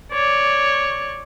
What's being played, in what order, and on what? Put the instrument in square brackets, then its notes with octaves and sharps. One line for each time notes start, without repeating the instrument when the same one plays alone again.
[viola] C#5 D5